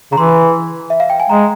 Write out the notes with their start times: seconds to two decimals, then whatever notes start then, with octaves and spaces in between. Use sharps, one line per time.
0.12 C#3 A#5
0.17 E3 C6
0.90 E5
1.00 F5
1.10 G5
1.20 G#5
1.29 G#3 A#5